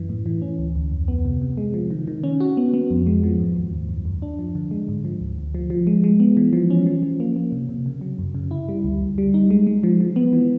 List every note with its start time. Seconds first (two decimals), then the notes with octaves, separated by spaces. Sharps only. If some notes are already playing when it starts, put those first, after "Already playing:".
Already playing: F#2 E3
0.09 A2
0.26 E3
0.42 C#4
0.59 D2
0.76 D2
0.91 F2
1.08 B3
1.25 C3
1.42 C3
1.57 G#3
1.74 F3
1.91 D#3
2.08 D#3
2.24 C#4
2.40 F#4
2.57 B3
2.74 B3
2.91 F2
3.07 G#3
3.24 F3
3.39 G#2
3.56 D#2
3.73 D#2
3.89 F#2
4.05 F#2
4.22 D4
4.39 F3
4.55 D3
4.71 G#3
4.89 G#2
5.05 F3
5.21 D2
5.38 D2
5.55 F3
5.70 F3
5.87 G#3
6.04 G#3
6.20 B3
6.37 E3
6.53 F3
6.70 C#4
6.86 F3
7.03 F3
7.20 A#3
7.36 A#3
7.52 C3
7.69 C3
7.86 C#3
8.01 F#3
8.19 F#2
8.35 C#3
8.51 E4
8.69 G3
8.84 D2
9.02 D2
9.18 G3
9.34 D#4
9.51 G#3
9.67 G#3
9.83 F3
10.00 F3
10.16 B3
10.33 E3